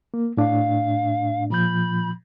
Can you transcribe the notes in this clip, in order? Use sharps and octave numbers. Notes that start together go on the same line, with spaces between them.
A#3
A2 D4 F5
A#2 F3 B5 G6